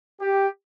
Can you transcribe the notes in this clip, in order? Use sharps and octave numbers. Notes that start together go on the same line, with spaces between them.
G4